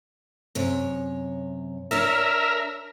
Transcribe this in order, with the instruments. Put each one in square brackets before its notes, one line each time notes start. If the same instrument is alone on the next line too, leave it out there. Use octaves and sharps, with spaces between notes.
[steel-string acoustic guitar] F#2 C3 C#5
[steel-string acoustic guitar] D4 C#5 A5 [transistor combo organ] A#4 E5